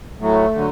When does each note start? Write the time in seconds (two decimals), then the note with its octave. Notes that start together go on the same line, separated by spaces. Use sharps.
0.20 A2 F#3 A3
0.54 D3 F#3